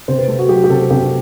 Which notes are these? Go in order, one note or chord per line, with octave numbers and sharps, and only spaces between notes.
C3 C5
B4
A3 A4
F#4
F#3 G4
G4
C3 A4
C3 G4